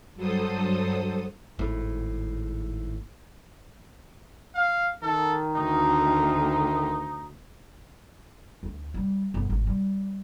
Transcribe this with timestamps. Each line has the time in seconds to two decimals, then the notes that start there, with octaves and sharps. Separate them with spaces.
0.15 G2 F#3 A4 C5 D#6
1.59 G#1 A2
4.55 F5
5.02 D#3 A4
5.56 D2 D#4
8.63 D2
8.94 G3
9.34 G1
9.50 G#1
9.67 G3